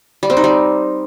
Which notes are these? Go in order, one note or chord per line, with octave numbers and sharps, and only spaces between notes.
G3
C4
D#4
G3